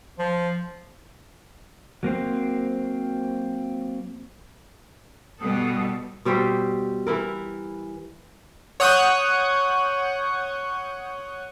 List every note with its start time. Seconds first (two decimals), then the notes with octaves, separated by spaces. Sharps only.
0.19 F3
2.03 F#3 A#3 C4 C5
5.40 B2 G3 A4 D#6
6.25 B2 G3 C5 E5
7.07 E3 E4 A#4
8.80 C#5 F#5 C#6 D#6 F#6 G6